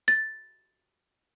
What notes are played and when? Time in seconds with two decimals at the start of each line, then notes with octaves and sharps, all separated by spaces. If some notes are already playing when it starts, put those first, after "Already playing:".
0.08 A6